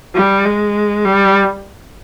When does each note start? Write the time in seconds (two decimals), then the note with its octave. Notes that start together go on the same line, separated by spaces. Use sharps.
0.15 G3
0.45 G#3
1.05 G3